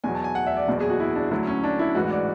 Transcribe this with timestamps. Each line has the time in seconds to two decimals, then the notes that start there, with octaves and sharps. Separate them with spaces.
0.04 E2 B2 F#3 G#5
0.15 A5
0.24 G#5
0.35 F#5
0.47 E5
0.57 D5
0.67 F#1 E2 B2 F#3
0.80 G#4
0.89 F#4
1.00 E4
1.15 D4
1.31 D2 D3 F#3 E4
1.47 C#4
1.63 D4
1.79 E4
1.95 A1 G#2 E3 F#4
2.10 D5